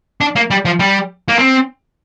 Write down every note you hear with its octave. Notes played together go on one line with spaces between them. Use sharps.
D4
A#3
G3
F3
G3
A#3
C4